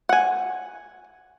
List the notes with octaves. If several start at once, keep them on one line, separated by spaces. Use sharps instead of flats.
F#5 G#5